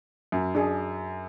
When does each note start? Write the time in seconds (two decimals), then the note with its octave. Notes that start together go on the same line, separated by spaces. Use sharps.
0.32 F#2
0.55 D4 G#4